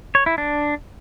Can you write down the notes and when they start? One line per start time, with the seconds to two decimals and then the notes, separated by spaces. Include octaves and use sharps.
0.15 C#5
0.26 E4
0.38 D4